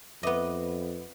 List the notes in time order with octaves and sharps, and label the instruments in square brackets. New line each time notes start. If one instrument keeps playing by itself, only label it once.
[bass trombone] F2 [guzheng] B3 D#5 [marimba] B4 E5 D6